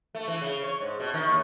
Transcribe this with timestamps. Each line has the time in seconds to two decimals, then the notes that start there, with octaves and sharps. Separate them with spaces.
0.15 A3
0.28 E3
0.42 C#3
0.64 C#5
0.81 G#2
1.00 B2
1.14 D#3
1.28 D#2